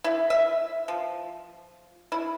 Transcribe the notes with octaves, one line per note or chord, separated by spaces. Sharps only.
E4
E5
F3
E4